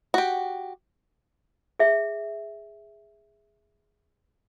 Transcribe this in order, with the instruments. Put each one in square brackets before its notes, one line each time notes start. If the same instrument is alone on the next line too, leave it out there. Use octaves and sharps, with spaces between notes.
[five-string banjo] F#4 G4
[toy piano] G#4 E5